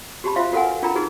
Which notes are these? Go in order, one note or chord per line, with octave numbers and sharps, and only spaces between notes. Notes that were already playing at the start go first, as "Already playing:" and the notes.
F#4 G4 A5 B5
F4 C5 E5 F5 C6
F#4 A4 A#4 F5 F#5 G#5
B4
D4 F4 A#4 G5 A#5 B5
D#4 F#4 G#4 B4